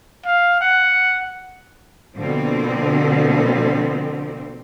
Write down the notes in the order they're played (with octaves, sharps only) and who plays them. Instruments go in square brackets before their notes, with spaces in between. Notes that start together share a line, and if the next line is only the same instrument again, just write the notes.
[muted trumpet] F5
F#5
[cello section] B2 D3 F3 A#3 C4